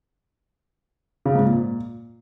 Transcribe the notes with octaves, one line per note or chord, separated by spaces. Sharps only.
C#3
G#2
A#2